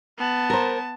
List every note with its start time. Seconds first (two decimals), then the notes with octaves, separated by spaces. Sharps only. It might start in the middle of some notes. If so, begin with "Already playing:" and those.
0.18 B3 A5
0.50 A#4 C5